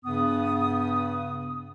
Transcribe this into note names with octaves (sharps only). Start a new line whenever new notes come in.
G2 C#3 B3 D#6